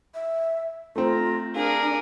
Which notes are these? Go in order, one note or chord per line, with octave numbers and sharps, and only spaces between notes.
E5
A3 C4 F4 A#5
D4 G#4 A#4 F5